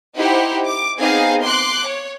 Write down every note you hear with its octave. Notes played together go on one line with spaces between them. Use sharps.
D#4 E4 G4 C5 F#5
D6
B3 C4 D#4 G#4 F5
C6 D6 F#6
C#5